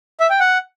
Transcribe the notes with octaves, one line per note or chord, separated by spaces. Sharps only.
E5
G5
F#5